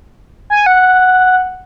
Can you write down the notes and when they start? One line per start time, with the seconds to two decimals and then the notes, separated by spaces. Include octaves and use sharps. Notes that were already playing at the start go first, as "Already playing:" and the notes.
0.50 G#5
0.66 F#5